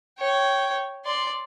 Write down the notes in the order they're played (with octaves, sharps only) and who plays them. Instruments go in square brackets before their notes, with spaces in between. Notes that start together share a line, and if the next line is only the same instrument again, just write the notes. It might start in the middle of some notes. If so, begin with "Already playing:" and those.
[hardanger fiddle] C#5 G5
D5 C6